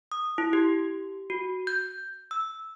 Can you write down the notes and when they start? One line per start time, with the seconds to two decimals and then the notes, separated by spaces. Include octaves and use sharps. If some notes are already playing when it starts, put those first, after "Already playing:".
0.12 D#6
0.38 E4
0.53 G4
1.30 F#4
1.67 G6
2.31 E6